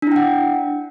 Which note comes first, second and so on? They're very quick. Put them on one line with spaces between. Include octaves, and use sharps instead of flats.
D4 E4 G5 F#5